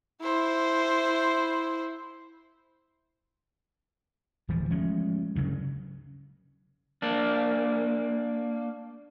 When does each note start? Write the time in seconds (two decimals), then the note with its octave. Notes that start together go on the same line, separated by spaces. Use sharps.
0.21 E4 C5
4.48 D1 E3 F3
4.70 F3 G#3 A3 C#4
5.36 G2 C#3 F#3
7.02 A#3 D4